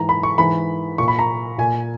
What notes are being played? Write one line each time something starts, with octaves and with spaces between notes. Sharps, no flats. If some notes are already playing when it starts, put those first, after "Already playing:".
Already playing: G#2 E3 A#5
B5
C#6
G#2 E3 B5
A#2 C#6
B5
A#5
A#2 G#5